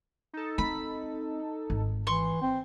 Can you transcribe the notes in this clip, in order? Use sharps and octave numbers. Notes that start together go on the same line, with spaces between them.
D#4 A4
C4 B5
G#1
E3 C6 C#6
C4